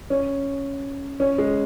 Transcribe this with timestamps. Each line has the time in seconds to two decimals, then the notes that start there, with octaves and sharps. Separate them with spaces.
0.10 C#4
1.20 C#4
1.38 G#3